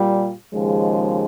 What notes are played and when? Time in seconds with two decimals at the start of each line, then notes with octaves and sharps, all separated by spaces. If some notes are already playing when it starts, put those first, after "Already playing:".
Already playing: A#2 G3
0.54 D#2 C#3 F3 G#3